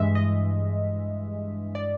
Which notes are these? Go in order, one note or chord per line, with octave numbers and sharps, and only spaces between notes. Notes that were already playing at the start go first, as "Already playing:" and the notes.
Already playing: G2 E3 G#3 D#5 E5
D#5
D5